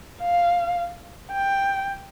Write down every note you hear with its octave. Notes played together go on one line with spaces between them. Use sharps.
F5
G5